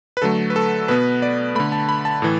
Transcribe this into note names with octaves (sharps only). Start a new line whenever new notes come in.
B4
D3 F#3 A3 A4
B4
A4
B2 B3 B4
D5
D3 A3 B5
A5
B5
A5
A2 E3